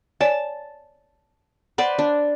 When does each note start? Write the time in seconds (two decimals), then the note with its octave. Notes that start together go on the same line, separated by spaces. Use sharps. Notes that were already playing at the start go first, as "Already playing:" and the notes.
0.21 C#5 D5 G#5 A5
1.78 B4 C5 D5 F#5
1.99 D4